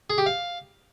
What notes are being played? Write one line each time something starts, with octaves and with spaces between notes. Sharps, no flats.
G#4
G4
F5